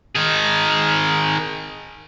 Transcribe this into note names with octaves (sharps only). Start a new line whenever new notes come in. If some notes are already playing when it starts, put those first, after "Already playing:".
D#3 G#4